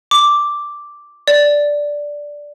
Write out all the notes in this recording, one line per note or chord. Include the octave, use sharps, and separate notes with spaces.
D6
D5